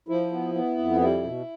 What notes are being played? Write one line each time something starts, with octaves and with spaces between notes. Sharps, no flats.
F3 E4
B3
B3
F2
G3 E4
B2